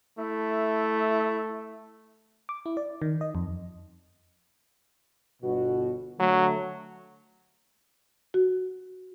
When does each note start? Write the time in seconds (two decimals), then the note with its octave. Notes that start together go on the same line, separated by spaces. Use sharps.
0.18 A3 E4
2.49 D6
2.66 E4
2.77 D5
3.02 D#3
3.21 D#5
3.35 F2
5.43 G1 B2 F#4
6.19 D3 F#3 A3
8.34 F#4